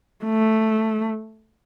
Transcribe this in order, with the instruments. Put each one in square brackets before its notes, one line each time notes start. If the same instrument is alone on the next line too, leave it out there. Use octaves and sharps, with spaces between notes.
[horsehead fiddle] A3